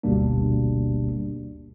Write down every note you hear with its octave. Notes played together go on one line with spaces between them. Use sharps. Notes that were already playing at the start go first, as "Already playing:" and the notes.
G1 D2 B2 G3 A#3 D4